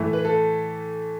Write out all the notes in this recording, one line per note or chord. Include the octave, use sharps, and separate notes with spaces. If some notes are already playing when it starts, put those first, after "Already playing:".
Already playing: A2 E3 A3
B4
A4